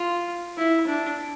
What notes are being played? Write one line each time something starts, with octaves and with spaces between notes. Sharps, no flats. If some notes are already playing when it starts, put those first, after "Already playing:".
Already playing: F4
E4
D4